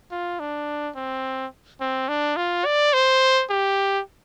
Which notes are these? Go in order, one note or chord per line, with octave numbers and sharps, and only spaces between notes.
F4
D4
C4
C4
D4
F4
D5
C5
G4